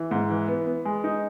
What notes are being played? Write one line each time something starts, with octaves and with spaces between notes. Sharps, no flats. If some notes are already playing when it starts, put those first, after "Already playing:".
Already playing: E3
G#2
E3
B3
B3
G#3
D#4